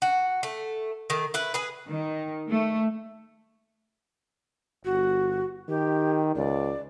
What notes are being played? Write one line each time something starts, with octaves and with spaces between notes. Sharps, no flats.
F#4
A3
D#3 A3
E4 B4
G#4 B4
D#3
A3
G1 F#4
D#3 G4
C#2 D5